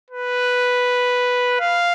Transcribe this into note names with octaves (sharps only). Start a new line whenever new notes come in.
B4
F5